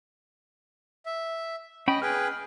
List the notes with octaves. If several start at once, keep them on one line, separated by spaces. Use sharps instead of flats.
E5
C#4 D#5 G5 B5
G#4 B4 G5 F6